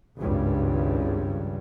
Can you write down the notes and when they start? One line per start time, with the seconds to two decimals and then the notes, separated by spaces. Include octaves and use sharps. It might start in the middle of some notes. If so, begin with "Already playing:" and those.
0.18 G#1 C#2 G2